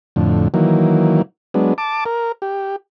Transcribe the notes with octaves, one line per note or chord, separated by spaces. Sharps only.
F2 A2 D3
D#3 E3 F#3 A#3
F#3 G#3 B3 D4
A5 D6
A#4
G4